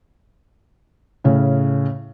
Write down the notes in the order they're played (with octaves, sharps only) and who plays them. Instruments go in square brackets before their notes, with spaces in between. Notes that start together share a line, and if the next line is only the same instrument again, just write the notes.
[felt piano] A2 C#3 C#4